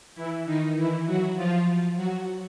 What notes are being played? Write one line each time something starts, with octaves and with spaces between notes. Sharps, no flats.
E3 E4
D#3 D#4
E3 E4
F#3 F#4
F3 F4
F#3 F#4